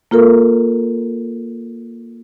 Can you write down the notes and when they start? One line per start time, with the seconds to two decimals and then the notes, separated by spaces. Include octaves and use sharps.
0.11 A#3 F4 A4 A#4